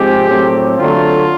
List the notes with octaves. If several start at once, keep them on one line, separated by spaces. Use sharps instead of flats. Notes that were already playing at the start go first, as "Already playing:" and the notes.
Already playing: G#2 F3 G#3 C4 G4
A2 F#3 A3 C4
D3 F#3 A3 F4